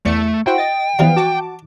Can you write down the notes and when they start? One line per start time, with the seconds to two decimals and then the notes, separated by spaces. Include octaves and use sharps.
0.06 E2 A3 D5 C#7
0.47 E4 F#4 C5 G5
0.58 D#5 A6
0.99 E3 F3 G3 B3 F5
1.16 F#4 A5 D6